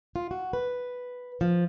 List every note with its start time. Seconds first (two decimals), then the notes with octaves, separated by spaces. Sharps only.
0.16 F4
0.31 F#4
0.53 B4
1.41 F3